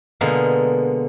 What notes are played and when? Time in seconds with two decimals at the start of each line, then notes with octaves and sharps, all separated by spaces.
0.21 B2 D3 G#3 A#3